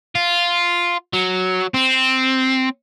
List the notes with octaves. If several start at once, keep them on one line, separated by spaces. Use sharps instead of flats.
F4
F#3
C4